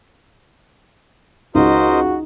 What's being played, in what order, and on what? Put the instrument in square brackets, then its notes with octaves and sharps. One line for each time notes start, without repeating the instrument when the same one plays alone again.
[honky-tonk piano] C#2 [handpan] D#4 [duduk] F#4 [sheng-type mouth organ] A#4 C5 D#5